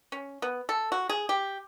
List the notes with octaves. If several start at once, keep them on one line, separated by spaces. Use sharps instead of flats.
C#4
B3
A4
F#4
G#4
G4